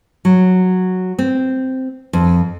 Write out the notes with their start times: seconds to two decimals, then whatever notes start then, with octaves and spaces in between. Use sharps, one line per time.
0.25 F#3
1.19 C4
2.13 F2